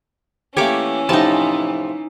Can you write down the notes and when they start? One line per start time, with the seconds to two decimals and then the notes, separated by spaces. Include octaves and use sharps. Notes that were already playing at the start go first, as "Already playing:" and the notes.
0.57 E3 A3 A#3 C#4 G4 C#5 D6
1.09 A2 C3 F3 D#4 A5